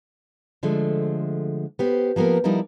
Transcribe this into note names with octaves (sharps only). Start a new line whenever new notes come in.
D3 F3 G#3 A3
B3 G4 C5
F3 A#3 B3 G4 A#4
F3 G3 D#4 E4 A#4